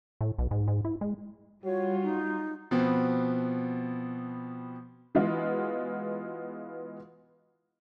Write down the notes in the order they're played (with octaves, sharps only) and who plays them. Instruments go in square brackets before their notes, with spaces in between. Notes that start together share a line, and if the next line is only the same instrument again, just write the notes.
[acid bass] A2
B1
G#2
G#2
E4
G#3
[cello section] G3 F4 [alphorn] F#4 [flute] C#5
[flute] D#4
[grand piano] B2 F3 B3 C4
[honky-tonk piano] E3 G#3 B3 F4 F#4